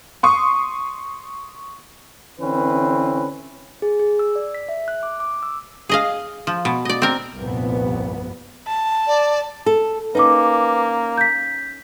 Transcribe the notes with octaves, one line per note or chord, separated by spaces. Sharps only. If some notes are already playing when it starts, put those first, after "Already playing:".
C6 C#6 D#6
D3 E3 C4 C#4 B4
G#4
G#4
E6
D5
B6
E5
F#6
D6
D6
E6
G#4 D#5 F5
F3
B2
D5 D#5
C4 A#4
F1 C2 G2 A#2 B3
A5
D5
A4
A#3 C#4 D#4 B4 D6
G6 B6